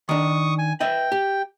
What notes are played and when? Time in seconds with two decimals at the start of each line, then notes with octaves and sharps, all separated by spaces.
0.09 D#3 D4 C#6 D#6
0.59 G#5
0.80 B4 D#5 E5 G5
1.12 G4